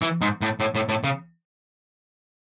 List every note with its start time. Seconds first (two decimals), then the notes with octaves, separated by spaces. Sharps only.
0.02 E3
0.21 G#2
0.42 A2
0.60 A2
0.75 A2
0.89 A2
1.04 C#3